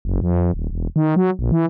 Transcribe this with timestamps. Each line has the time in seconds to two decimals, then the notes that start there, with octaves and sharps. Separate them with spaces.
0.05 F#1
0.22 F2
0.54 D#1
0.70 E1
0.96 D#3
1.16 F#3
1.39 A#1
1.52 E3